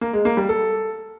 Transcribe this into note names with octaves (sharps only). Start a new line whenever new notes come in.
A#3
G#3
A#3
G3
A4